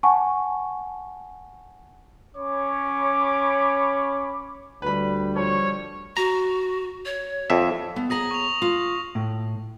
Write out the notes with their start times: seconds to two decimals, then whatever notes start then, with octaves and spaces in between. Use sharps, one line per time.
0.03 F#5 G#5 A5 C#6
2.36 C#4 C#5 B5 D6
4.82 D2 G3 B4 B5
5.36 F3 C#5
6.17 F#4 A#5
7.06 C#5
7.50 F2 E5
7.96 B3
8.10 G#4 C#5 A#5 D#6 A#6 F#7
8.31 C#6 F7
8.62 F4
9.15 A2